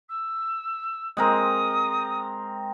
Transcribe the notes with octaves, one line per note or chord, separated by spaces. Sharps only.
E6
G#3 C4 A#4 D#6